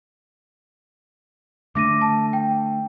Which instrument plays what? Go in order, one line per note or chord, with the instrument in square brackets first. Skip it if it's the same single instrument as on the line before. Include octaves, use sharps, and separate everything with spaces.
[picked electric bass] D3 A3 D4 [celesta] D6 A#6 D#7
[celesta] A5
G5